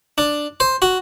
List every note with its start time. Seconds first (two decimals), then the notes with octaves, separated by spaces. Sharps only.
0.18 D4
0.60 C5
0.82 F#4